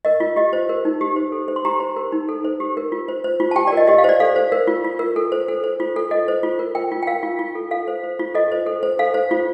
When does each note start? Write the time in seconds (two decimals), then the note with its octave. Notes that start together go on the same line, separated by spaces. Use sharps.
0.05 A#4 D#5
0.20 F4
0.36 G4 D#5
0.53 C5
0.69 A#4
0.85 D#4
1.01 G4
1.16 C5
1.32 A4
1.48 C5
1.56 C6
1.65 G4 A#5
1.80 C5
1.96 A#4
2.12 D#4
2.29 A4
2.45 C5
2.60 G4
2.77 A#4
2.92 F4
3.08 C5
3.24 C5
3.40 F4
3.51 A5
3.56 G4 G5
3.67 D5
3.72 A#4 D#5
3.88 G4 D#5
3.98 F5
4.04 C5 D5
4.20 A4 F5
4.36 C5
4.52 A#4
4.67 F4
4.85 F4
4.99 A#4
5.16 A4
5.32 C5
5.48 A4
5.64 C5
5.80 F4
5.96 A4
6.11 A4 D#5
6.28 C5
6.43 F4
6.59 A#4
6.75 A#4 G5
6.92 F4
7.02 G5
7.07 A#4 F5
7.23 F4
7.39 F4
7.55 A4
7.71 A4 F5
7.88 C5
8.04 C5
8.19 F4
8.35 A4 D#5
8.52 C5
8.66 A4
8.83 C5
8.99 A4 F5
9.14 C5
9.31 F4